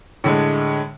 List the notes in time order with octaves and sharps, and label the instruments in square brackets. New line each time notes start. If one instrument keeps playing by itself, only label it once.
[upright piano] A2 D3 G#3